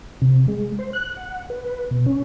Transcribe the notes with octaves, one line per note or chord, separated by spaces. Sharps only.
C3
G#3
C5
F#6
F#5
B4
B2
C#4